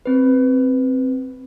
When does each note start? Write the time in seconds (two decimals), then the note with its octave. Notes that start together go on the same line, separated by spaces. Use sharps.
0.06 C4 B4